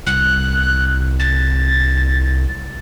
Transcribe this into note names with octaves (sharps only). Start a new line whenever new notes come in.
C2 F#6
A6